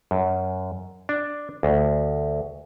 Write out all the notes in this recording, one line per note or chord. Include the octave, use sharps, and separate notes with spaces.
F#2
D4
D2